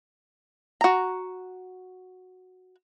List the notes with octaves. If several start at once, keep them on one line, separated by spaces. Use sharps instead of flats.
F#4 A#5